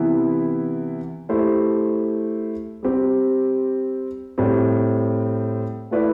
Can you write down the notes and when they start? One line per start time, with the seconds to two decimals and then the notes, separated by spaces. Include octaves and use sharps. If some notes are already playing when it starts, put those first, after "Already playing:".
Already playing: C3 E3 B3 E4
1.29 A3 E4 G4 C5
2.83 G3 C4 G4
4.38 A2 G3 C4
5.91 A3 E4 B4 D5